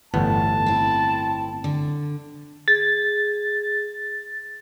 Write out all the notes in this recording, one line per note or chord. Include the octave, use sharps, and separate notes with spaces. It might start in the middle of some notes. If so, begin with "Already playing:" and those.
G1 E2 A2 B3 A5
C4 E4
D3
G#4 A6